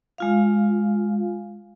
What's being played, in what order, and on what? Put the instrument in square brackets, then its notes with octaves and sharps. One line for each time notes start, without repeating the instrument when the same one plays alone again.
[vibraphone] G#3 F4 F5